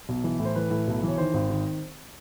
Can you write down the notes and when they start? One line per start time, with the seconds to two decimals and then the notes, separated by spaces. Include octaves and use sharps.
0.09 B1
0.24 E3
0.40 A2
0.45 C5
0.55 E3 B4
0.71 A2
0.88 B1
1.03 E3 C#5
1.18 D#3 C5
1.34 G#1
1.50 D#3